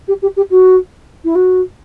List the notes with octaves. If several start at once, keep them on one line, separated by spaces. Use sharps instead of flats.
G4
G4
G4
F#4
E4
F#4